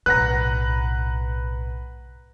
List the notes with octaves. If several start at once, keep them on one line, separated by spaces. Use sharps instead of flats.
B1 A2 B4 F#5 A#5 F#6 A#6